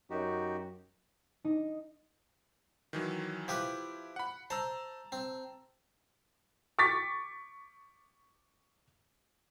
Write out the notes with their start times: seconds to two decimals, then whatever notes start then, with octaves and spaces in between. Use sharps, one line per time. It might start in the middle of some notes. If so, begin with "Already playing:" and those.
0.10 F#2 D#4 F#4 G4
1.45 D#4
2.93 D#3 E3 F#3
3.48 F3 E4 G4 B4
4.16 F#5 B5
4.50 C5 A5 A#5 E6
5.12 C4
6.79 C#6 D6 A6 B6